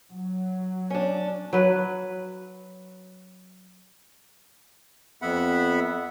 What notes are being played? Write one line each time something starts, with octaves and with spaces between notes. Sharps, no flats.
F#3
C#4 D4
F#3 B4
F2 B3 E5 F#5 B5